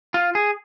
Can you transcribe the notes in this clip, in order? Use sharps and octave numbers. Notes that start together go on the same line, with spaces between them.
F4
G#4